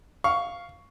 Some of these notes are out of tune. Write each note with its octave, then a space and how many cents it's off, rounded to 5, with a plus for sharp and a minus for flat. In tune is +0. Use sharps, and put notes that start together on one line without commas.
F5 +0 C#6 +10